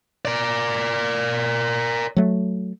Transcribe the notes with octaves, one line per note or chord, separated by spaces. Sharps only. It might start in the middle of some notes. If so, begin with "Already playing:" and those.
A#4 D5
F#3 A3